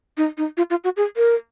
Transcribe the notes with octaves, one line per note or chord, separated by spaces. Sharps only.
D#4
D#4
F4
F4
F#4
G#4
A#4